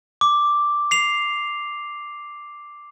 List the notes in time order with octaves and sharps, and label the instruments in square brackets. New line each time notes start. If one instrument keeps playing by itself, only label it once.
[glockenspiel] D6
C7 F7